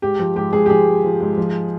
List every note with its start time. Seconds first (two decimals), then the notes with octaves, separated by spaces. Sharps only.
0.02 G#2 G4
0.19 F3
0.36 G#2 G4
0.53 G#2 G#4
0.66 G4
0.70 F3 G#4
0.87 G#2
1.04 F3
1.20 G#2
1.38 F3